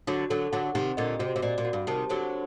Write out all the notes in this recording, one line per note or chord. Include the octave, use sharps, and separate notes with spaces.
D3 F#3 F#4
D3 F#3 A4
D3 F#3 F#5
C3 D#3 G4
A#2 D3 D#5
C3 F#4
C3
A#2 D5
A#2
F#4
G2
C3 D#3 A5
D3 F#3 C5